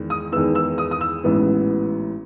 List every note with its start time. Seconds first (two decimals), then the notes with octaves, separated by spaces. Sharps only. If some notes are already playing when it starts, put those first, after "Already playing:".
Already playing: E2 D#3 G#3
0.10 D#6
0.32 E2 D#3 G#3 B3 E6
0.55 E6
0.78 D#6
0.91 D#6
1.01 E6
1.24 A1 G#2 E3 B3